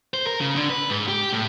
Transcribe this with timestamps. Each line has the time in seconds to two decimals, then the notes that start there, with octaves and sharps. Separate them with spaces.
0.14 C5
0.27 A#4
0.41 C#3
0.56 D3
0.70 B4
0.90 G#2
1.08 G4
1.33 A2